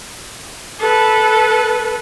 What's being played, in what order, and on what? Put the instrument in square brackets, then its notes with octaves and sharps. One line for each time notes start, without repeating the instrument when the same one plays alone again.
[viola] A4 B4